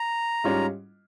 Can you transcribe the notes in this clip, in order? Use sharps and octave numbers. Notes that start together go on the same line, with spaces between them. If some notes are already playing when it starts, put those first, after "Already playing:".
Already playing: A#5
G#2 G3 C#4 F4